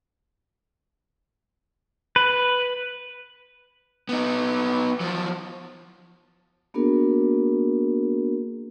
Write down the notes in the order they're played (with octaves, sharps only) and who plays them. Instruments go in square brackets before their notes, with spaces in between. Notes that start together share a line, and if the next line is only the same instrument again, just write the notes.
[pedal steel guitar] B4
[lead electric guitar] B3 D#4
F3 F#3
[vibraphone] A#3 B3 D4 F#4 G#4 A#4